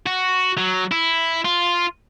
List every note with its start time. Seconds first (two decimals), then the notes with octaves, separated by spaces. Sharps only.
0.06 F#4
0.57 F#3
0.91 E4
1.45 F4